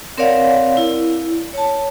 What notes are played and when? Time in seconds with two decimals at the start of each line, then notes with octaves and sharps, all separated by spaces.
0.18 C4 A#4 C#5 D5 F5 F#5
0.77 E4
1.53 C#5 A5